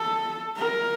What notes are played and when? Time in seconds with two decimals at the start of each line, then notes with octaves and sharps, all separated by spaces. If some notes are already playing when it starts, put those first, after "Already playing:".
Already playing: A4
0.57 A#4